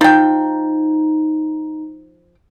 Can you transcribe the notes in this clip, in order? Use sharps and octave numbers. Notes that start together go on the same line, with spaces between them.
F3 D#4 G5